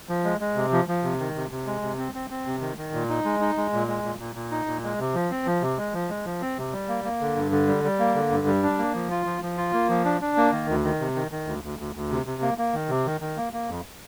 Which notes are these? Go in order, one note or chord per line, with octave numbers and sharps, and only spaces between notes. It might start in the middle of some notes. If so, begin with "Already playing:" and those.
F3
G#3
G#3
C3
F3
F3
C3
D#3
C3
C3
G#3
C3
C4
C4
C4
C3
D#3
D#3
A#2
D#4
G#3
D#4
G#3
A#2
G#3
A#2
A#2
A#2
D#4
A#2
G#3
C3
F3
C4
F3
C3
G#3
F3
G#3
F3
C4
C3
G3
A#3
A#3
D3
G2
D3
G3
G3
A#3
D3
G2
G3
D4
A#3
F3
F4
F3
F3
F4
A#3
F3
D4
D4
A#3
D#3
D2
D#3
C3
D#3
D#3
D2
D2
D2
D2
C3
C3
A#3
A#3
D#3
C3
D#3
D#3
A#3
A#3
F2